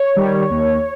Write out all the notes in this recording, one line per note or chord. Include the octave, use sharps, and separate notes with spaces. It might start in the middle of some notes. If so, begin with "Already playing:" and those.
Already playing: C#5
D#3 G3
D#2